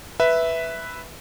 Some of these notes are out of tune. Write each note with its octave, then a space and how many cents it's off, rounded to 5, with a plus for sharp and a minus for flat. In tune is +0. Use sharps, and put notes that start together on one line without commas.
B4 +0 E5 -5